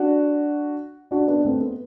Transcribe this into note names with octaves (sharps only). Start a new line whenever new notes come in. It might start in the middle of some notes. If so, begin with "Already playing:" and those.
Already playing: D4 F#4
D4 F#4
B3 D4
A3 C4
B3